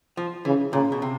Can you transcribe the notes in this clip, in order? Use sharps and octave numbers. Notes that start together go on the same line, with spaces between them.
F3
C#3 E3
A#2 C#3
B2
C3